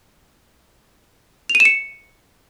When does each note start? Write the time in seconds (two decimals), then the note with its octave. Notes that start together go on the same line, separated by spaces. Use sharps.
1.50 F7
1.55 D#7
1.60 E7
1.65 C#7